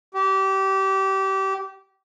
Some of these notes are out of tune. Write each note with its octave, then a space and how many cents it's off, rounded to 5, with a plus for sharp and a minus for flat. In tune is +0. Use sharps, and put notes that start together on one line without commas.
G4 -25